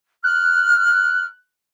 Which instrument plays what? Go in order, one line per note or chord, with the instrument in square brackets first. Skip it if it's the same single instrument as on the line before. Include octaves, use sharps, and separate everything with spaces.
[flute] F6 [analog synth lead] F#6